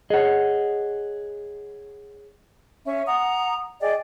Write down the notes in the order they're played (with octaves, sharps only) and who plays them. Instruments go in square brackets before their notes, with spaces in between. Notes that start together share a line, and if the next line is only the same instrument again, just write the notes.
[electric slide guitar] G#4 C#5 [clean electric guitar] D#5 F#5
[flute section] C#4 E5
F#5 A#5 D#6
G#4 D5 D#5 G5